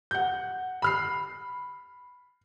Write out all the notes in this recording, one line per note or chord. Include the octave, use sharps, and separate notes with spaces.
F#5 G6
B5 F6 C7